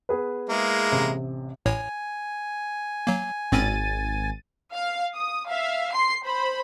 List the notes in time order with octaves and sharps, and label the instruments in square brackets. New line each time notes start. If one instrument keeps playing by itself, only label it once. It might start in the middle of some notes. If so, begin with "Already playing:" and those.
[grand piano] B3 G#4 B4
[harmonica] G#3 A#3 E4
[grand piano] A1 C3
[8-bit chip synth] A1 A2 C#5 [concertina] G#5
[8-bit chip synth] F#3 A#3
[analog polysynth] G#1 A6 D#7 [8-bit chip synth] A2 C4 C#4
[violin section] F5
D#6
E5 F5
C6 C7
C5 B5